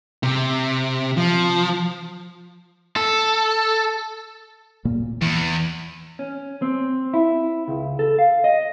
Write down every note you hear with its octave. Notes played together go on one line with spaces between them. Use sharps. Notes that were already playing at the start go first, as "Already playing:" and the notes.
C3
F3
A4
D1 A#2 A#3
E2 E3
C#4
C4
E4
C#2
A4
F5
D#5